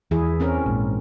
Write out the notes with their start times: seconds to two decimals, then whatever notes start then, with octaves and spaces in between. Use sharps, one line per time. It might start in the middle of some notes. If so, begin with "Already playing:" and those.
0.11 E2 E3 E4 G#4
0.40 C4 C#4 A#4
0.66 A#1 G#2